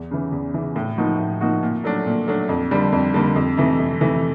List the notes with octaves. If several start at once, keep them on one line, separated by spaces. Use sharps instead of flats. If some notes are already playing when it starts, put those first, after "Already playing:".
Already playing: E2
C#3 E3
E2
C#3 E3
A2
F3 A#3 D#4 F#4
A2
F3 A#3 D#4 F#4
A#2
F#3 A3 D4
A#2
F#3 A3 D4
F2
D3 G3 A#3
F2
D3 G3 A#3
F2
C3 E3 A3
F2
C3 E3 A3